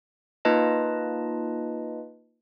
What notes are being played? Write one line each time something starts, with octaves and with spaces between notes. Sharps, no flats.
A#3 D#4 F4 B4 D#5 A5